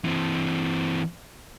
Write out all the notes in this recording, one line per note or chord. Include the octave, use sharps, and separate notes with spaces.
E3 C4